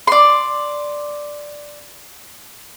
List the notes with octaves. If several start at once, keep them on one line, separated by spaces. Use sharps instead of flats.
D5 C6